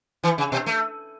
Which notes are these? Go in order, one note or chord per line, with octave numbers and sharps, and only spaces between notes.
E3
C#3
B2
A3